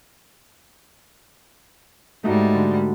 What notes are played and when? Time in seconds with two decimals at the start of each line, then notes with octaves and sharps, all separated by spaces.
2.24 G#2 G3 A3 D#4 F#4
2.55 D3